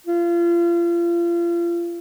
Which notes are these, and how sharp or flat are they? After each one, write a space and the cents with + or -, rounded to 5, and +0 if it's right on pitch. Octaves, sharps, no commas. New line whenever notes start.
F4 -35